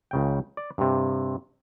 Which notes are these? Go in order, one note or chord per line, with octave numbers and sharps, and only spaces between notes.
C#2 C#3 G5
D5
G2 C3